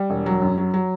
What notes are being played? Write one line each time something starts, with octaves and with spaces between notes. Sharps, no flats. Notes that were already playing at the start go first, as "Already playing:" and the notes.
Already playing: G3
E1
F#3
F#2
F#3
F#3